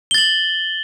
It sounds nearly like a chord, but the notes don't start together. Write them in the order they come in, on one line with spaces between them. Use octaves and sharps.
G7 A6 F#7